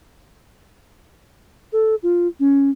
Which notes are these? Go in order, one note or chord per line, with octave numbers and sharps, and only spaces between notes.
A4
F4
C#4